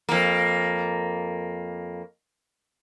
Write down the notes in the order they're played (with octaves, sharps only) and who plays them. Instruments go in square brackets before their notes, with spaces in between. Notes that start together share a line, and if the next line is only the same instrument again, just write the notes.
[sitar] F2 A#3